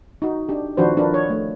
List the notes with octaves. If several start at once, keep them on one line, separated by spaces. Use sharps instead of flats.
D#4 F#4
D4 G4
D#3 F3 D4 F#4 B4 C5
D4 F4 A#4 B4
C#5
A3